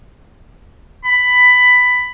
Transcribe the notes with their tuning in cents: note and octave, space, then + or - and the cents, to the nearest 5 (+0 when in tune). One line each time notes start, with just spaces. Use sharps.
B5 +10